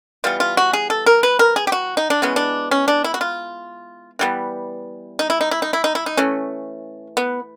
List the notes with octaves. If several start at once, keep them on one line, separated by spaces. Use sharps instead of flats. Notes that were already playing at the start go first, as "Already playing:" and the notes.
E3 G3 B3 F4
F4
F#4
G#4
A4
A#4
B4
A#4
G#4
G4
F#4
D#4
D4
E3 G#3 B3 C#4
D4
C#4
D4
E4
F#4
F4
E3 G3 B3
D#4
E4
D#4
E4
D#4
E4
D#4
E4
D#4
E3 A3 C#4
B3